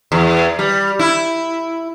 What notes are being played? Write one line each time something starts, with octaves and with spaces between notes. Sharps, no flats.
E2
G3
E4